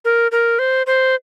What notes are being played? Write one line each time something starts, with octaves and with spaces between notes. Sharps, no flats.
A#4
A#4
C5
C5